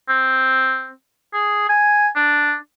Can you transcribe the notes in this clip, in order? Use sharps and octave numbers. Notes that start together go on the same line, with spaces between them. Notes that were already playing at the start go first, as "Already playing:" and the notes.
C4
G#4
G#5
D4